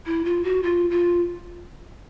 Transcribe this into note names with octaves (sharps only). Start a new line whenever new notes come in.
E4
F4
F#4
F4
F4